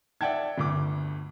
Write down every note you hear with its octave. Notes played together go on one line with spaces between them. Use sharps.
D5 E5 F#5 G5 A5 G#6
G1 D2 D6